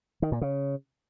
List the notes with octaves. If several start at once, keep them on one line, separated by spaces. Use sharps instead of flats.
D#3
A#2
C#3